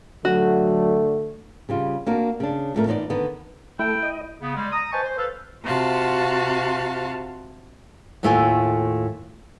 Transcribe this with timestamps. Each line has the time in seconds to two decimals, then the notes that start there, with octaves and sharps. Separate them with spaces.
0.25 D3 F#3 A3 F#4
1.69 C#3 G3 F4
2.06 A#3 D4 F#4 A#4
2.40 C#3 D4
2.74 F2 A2 A3 A#4
2.87 E3 B3 D#4 C#5 D5
3.10 D3 D#3 B3
3.79 A3 E4 G5
4.03 D#5
4.41 C#3 B3
4.56 G3 G#3
4.72 A#5 D#6
4.92 B4 C5 D#5 G#5 A5 C#6
5.03 C5
5.17 A4 B4 F5
5.63 C3 F4 F#4 F5 A5
8.23 D#2 A2 A3 E4 F4 G#5